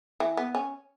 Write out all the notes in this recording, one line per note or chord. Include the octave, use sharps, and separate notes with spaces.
E3
B3
C#4